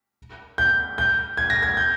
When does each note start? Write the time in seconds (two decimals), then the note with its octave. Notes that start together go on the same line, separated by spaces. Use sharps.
0.58 G6
0.98 G6
1.37 G#6
1.50 A#6
1.63 G#6
1.77 G6